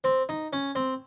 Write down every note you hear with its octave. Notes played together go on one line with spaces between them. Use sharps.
C4
D#4
C#4
C4